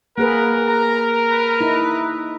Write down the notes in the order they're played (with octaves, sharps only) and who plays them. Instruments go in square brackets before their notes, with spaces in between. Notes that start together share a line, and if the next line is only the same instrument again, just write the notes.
[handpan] A#3 G#4 B4 [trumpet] A#4 [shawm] F#5
[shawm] A#5
B4
[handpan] D#4 E4